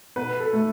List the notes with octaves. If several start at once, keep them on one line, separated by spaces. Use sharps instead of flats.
B2 B4
A4
A3